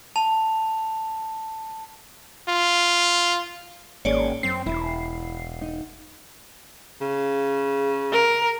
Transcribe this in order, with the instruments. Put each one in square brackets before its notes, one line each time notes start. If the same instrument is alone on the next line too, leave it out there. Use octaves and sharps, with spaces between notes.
[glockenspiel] A5 F7
[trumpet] F4
[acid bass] G#1 [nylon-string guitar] A#3 C#4 G#4 [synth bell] C#5 D5
[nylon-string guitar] F#2 [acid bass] C4 [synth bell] C7
[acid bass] E1 [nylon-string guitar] E4
[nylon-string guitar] D#4
[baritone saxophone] C#3
[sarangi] A#4